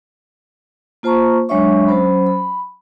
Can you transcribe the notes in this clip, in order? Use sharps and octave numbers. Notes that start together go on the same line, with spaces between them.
A#3 F4 C5 A5 A#5 C#6
F#3 G#3 D4 C#5 E5 C#6
F#3 C#4 C5 B5
B5